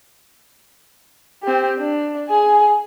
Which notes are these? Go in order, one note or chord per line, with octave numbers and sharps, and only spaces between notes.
C4 G4
D4
G#4 G#5